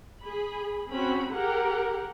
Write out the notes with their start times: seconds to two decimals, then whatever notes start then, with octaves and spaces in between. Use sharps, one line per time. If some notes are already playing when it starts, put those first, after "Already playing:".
0.23 G#4 B5
0.92 C4 C#4 F#4 B5
1.34 G4 G#4 A#4 F#5